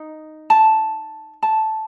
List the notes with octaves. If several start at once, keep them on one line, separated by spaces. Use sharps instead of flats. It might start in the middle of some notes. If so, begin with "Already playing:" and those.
Already playing: D#4
A5
A5